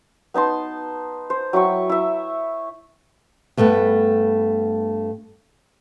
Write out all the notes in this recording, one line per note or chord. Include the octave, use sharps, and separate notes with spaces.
B3 D#4 A5 C6
C5
F#3 E4 G5 C#6
E4 E5
G2 A3 B3 A4 B4